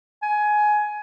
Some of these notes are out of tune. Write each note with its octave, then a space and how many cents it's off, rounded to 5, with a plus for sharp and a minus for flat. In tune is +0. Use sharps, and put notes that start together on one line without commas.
G#5 +15